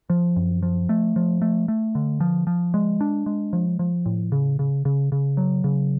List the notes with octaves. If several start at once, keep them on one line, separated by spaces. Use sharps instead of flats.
F3
F#2
F3
A3
F3
A3
A3
D3
F3
F3
G#3
D4
G#3
F3
F3
A2
C#3
C#3
C#3
C#3
F#3
C#3